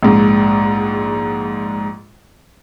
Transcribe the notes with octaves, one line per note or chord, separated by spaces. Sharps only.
A#1 G#2